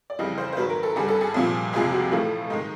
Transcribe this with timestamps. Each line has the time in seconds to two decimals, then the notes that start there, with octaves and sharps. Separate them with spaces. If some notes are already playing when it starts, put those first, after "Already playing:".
0.10 D5
0.19 F2 C#3 E3 G3 D#5
0.38 C5
0.53 C5
0.57 G#2 D#3 F#3 B4
0.70 A#4
0.83 A4
0.96 G2 D3 G3 G#4
1.08 A4
1.21 G#4
1.34 C2 A#2 F3
1.73 F2 C3 F3 G#3 G#4
1.93 F#4
2.12 A2 E3 A3 F4
2.50 G#2 D#3 G#3 D#4